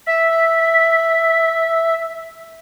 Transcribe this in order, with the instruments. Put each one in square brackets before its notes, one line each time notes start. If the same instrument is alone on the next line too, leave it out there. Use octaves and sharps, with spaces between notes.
[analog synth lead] E5 [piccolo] B6